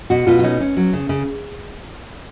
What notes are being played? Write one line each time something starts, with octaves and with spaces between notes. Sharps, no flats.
B2 F#4
B2 F4
F4
C#4 D#4
C#4
F#3
C#3
C#3